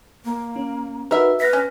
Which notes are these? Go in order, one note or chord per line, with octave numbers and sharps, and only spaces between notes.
A#3
C#4
D#4 F#4 A#4 B4 E5
B4 F6 A#6 B6
C#4